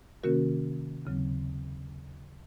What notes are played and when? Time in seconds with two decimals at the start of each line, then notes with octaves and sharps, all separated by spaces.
0.23 C3 D#3 A#3 C#4 F#4 A#4
1.05 D#2 C#3 F#3 C4